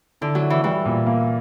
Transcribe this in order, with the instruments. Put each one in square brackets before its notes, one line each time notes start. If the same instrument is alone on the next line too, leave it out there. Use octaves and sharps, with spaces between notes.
[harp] D3 [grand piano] E4
[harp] F#3
[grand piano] E4
[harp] E3
[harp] E3 [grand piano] G3
[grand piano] A#2
A#3